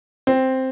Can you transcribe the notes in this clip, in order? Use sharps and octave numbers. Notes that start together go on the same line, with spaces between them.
C4